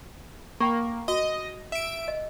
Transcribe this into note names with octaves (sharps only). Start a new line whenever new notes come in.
A#3 G5 B5 C#6
F#4 D#5
E5 D7
D#5